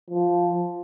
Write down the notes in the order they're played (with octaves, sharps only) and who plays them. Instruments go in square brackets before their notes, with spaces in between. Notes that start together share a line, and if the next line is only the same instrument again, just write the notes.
[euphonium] F3